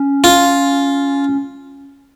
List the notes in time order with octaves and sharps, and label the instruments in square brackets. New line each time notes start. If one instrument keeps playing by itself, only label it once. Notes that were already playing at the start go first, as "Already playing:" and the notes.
Already playing: [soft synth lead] C#4
[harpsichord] F4